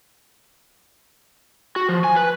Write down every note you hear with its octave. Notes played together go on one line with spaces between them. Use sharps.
F#4
F3
G#5
B4